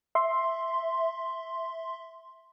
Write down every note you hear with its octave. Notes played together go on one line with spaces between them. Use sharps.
E5 C6